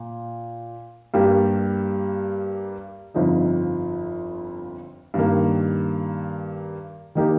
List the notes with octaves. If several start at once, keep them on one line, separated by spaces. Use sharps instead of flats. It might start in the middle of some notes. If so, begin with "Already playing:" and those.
Already playing: A#2
G2 G3 A#3 G4
G1 F2 F3 D#4
G2 D#3 A#3
D#3 A#3 D#4 G4